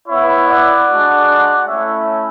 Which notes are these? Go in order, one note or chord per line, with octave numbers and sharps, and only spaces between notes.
B3 E4 C#5 E5
D5 F#5
G#3 D4 F#4
A3 C#4 E4 C#5 E5